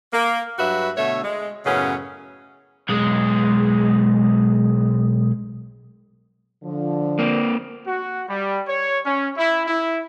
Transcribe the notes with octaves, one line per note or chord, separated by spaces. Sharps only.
A#3
G2 F#3 F#4 B4 E5
B2 D3 A3 C#5 E5
G#3
F#2 A2 C#3 B3 C#4
B1 G#3
D3 F3
A#3 C4
F#4
G3
C#5
C#4
E4
E4